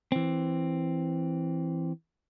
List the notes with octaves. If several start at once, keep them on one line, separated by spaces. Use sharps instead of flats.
E3 C4